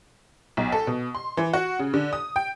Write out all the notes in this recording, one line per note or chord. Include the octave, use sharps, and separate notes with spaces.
B1
A4
B2
C6
E3
F#4
C#3
D3
D#6
G5